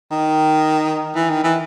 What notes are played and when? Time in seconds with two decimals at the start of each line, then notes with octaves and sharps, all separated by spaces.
0.11 D#3
1.15 E3
1.30 D#3
1.44 E3